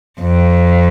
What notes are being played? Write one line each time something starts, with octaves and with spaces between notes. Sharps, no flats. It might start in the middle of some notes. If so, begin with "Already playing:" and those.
F2